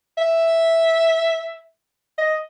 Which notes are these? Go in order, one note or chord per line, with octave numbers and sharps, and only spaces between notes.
E5
D#5